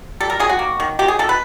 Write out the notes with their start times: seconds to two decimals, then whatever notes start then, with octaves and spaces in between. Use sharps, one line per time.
0.20 G3 A4
0.30 A#4
0.40 D#3 G#4
0.49 F#4
0.59 A#3
0.80 D#3
0.99 D#3 G4
1.08 G#4
1.19 D#3 A4
1.29 B4